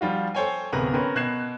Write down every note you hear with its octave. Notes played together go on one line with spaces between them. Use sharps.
F3 G3 F4 F#4
A4 C5 C#5 G5 G#5
D1 C3 B3 A#4 B4 A#5
C4 C#4 A#4 B4
B2 F#6 G#6 C7 E7